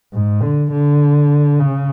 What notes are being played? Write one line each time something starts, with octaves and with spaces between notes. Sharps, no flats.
G#2
D3
D3
C#3